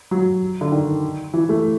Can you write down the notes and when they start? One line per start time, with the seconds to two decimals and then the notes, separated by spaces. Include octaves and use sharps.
0.11 F#3
0.61 D3
0.72 D#3
1.34 E3
1.49 A3